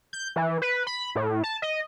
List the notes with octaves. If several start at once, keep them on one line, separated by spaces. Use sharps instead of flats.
G6
E3
B4
B5
A2
A5
D#5